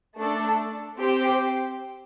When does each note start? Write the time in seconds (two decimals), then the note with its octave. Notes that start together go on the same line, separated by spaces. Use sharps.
0.15 A3 D4 A4
0.97 C4 G4 C5 G5